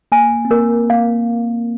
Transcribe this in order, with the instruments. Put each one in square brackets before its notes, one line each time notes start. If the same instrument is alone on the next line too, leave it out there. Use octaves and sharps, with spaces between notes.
[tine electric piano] A#3 [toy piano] G#5
[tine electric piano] C4
[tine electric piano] A#3 [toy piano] A#4
[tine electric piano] A#3 [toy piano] F5